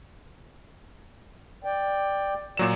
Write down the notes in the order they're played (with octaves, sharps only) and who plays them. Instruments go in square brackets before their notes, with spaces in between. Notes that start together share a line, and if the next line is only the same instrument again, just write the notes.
[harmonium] D5 G5
[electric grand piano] A#2 F#3 E7 [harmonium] D5